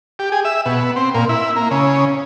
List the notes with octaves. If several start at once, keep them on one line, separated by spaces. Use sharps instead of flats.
G4
G#4
E5
B2
B3
C4
A#2
E4
A#3
C#3